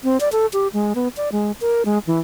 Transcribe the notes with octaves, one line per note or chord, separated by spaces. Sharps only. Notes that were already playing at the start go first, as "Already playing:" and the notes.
C4
D5
A4
G4
G#3
B3
D5
G#3
A#4
G#3
E3